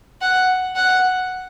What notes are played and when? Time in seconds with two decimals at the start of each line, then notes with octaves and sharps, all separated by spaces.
0.21 F#5
0.76 F#5